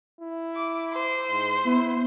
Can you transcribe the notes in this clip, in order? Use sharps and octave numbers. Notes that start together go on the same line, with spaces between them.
E4
D6
C5
G#2
B3 E4